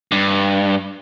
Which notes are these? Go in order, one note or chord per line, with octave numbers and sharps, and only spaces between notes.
G2